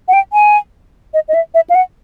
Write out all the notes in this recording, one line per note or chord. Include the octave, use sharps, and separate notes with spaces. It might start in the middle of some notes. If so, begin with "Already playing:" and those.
F#5
G5
G#5
D#5
D#5
E5
E5
F5
F#5